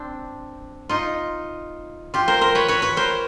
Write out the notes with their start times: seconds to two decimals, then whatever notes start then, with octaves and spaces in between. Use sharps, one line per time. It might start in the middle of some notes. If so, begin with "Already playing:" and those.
Already playing: C4 D4
0.89 D#4 F4
2.14 F4 G4
2.28 A#4 C5
2.41 A#4 C5
2.55 B4 C#5
2.68 B4 C#5
2.82 B4 C#5
2.97 A#4 C5